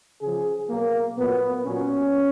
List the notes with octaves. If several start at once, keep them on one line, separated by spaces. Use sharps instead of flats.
C#3 F3 G#4
B2 F#3 A#3
A#2 F#3 B3
A#2 F#3 C#4